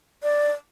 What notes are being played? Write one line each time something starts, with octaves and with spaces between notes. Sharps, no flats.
D5